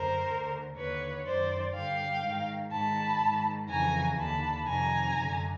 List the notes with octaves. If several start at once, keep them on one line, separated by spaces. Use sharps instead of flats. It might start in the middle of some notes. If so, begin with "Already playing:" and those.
Already playing: F#2 D3 A#4 C5
D2 D3
D#2 D3 B4 C#5
F#2 D#3 C5 D5
G2 D3 F5 G5
G#2 D#3
G#2 D#3 A5 B5
G#2 D#3
F2 C#3 E3 G#5 A#5
D#2 D3 A5 B5
F2 C3 D#3 G#5 A#5
F#2 D3